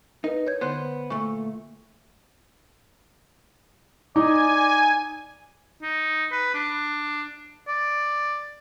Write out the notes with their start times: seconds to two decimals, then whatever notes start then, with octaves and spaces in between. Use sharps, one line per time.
0.24 D#4 A#4 B4
0.47 C#5 G6 G#6
0.61 D3 B3 C5 F#6
1.10 A#2 A3 C#6
4.16 D#4 D5 G#5
5.82 D#4
6.32 B4
6.54 D4
7.68 D5